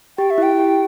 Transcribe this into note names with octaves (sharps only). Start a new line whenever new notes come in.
G4 G5
E5
E4 G5
G4